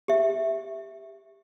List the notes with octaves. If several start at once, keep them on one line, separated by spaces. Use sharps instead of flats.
G4 E5